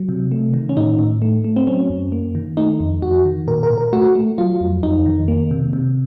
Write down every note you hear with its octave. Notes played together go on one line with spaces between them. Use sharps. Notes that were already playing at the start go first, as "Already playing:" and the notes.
Already playing: F#3
C3
A3
D#3
C#4
A2 D#4
A2
A3
A3
C4
F#3 C#4
F#2
A#3
D#3
A3 D#4
F2
F2 F#4
D#3
A#2 A#4
A#4
A#2
A#4
A3 F#4
A3
F#3 F4
F2
F2 D#4
D#3
A#3
C3
C3